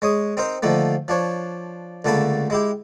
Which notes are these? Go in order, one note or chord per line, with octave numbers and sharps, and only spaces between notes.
G#3 C#5 D#6
C4 D#4 A#4 C5
D3 D#3 F3 A3 A#3
F3 D4 C#5
C#2 D3 A3 A#3 A5 B5
G#3 E4 G4